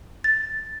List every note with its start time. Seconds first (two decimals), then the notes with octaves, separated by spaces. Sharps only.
0.24 A6